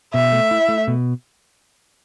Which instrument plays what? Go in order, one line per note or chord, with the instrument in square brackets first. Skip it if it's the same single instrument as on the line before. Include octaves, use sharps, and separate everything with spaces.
[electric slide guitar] B2 [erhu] E5
[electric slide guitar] A3
E4
A3
B2